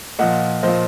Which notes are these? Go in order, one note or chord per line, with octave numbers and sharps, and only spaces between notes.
A#2 F3 D#5 F#5
A#2 F3 C5 D#5